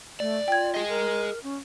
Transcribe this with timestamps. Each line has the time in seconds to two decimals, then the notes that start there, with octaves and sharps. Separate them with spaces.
0.20 A3 D5
0.48 F4 G5 G#6
0.74 G#4 D#5
0.89 A#4
1.43 C#4